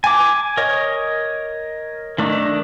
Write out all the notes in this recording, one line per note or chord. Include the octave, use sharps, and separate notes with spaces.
G#5 D6
A#4 C#5 D#5
D#3 A3 D4 D#4